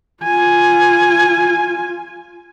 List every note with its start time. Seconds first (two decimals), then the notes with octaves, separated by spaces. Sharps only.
0.23 F4 G#5